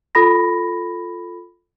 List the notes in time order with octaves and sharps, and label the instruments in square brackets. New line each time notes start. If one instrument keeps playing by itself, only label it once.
[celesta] F4 A4 B5 A#6